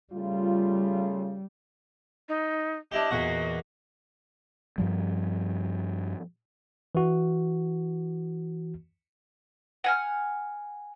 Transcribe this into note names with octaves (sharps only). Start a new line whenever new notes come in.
C#3 G3 A3 F4
D#4
D4 E4 G4 D#5
E2 A#2 F#4
G2 F3 G3
E3 F#4
F#5 G#5 F6